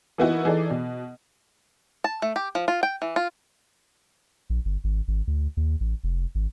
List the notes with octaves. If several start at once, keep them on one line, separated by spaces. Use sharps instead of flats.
E3 A#3 B3 D#4 E4 F#4
E3 D#4 G#4 A4 D5
B2
A5
A3
G4
F3
F4
G5
E3
F4
A#1
G1
G#1
G#1
D2
D#2
A1
F1
G#1